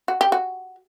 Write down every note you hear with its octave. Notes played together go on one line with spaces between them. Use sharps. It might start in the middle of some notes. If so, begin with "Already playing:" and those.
F#4
G4
F#4